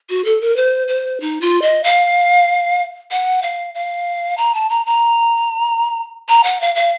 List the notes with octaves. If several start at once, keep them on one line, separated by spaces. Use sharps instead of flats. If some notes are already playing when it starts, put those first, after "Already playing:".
F#4
A4
A#4
C5
C5
D#4
F4
D#5
F5
F#5
F5
F5
A#5
A5
A#5
A#5
A#5
F#5
F5
F5